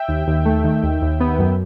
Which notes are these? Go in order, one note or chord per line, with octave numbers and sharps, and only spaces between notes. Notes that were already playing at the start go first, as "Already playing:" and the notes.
Already playing: E5 G5
D#2
D#2
A3
D#3
D#2
D#2
B3
F#2